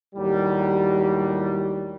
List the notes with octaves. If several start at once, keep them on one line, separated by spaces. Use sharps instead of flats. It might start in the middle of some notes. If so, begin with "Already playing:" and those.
D#2 A2 F#3 G3